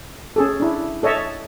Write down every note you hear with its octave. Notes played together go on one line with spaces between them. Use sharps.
C#4 G#4 A4
D4 E4
A4 C#5 D#5 E5 A5